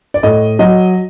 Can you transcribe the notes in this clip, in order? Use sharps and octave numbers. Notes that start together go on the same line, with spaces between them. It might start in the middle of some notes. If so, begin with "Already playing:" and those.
D5
A2 D#5
F#3 D#5